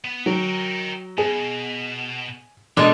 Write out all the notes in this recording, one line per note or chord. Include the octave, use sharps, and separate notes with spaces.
B3
F#3 A#4 G5
B2 G#4
B2 G3 G#3 D4 A4